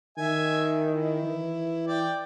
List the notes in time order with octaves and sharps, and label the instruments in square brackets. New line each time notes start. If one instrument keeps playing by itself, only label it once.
[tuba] D#3 [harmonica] E5 G#5
[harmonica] E4
[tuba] E3
[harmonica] D5 G5